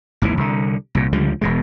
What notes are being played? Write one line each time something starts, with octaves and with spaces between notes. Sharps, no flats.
G#1 D#2 C3 E3
C2 D3
C2 A#2
C#2 D3 F3 G3
E1 B2 G#3